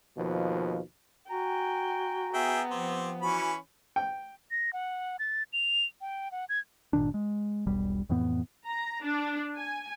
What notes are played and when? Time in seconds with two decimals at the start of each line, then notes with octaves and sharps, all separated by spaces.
0.17 D#2 B2 F3
1.30 F#4 G5 G#5 A#5
2.34 B3 G#4 E5 G5
2.71 F3 C4 G4
3.22 E3 C#4 F#4 B5
3.96 G5
4.51 A#6
4.73 F#5
5.19 A6
5.53 F7
6.01 G5
6.32 F#5
6.49 G#6
6.93 G1 A#2 D#3 D4
7.14 G#3
7.66 E1 B1 G3
8.09 F2 A2 E3 B3
8.65 A#5
9.02 D4
9.57 G#5